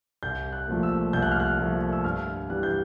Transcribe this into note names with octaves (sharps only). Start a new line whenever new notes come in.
C2 G6
F#6
A#2 F3 A3
E6
C2 G6
F#6
F6
F#6
A#2 F3 A3
E6
G2 F6
E3 G3 F#6
G6